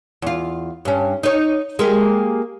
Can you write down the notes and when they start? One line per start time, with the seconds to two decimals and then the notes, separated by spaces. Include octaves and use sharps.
0.22 E2 F4
0.85 G2 C#4
1.23 D#4 C#5
1.79 G#3 A#3 G4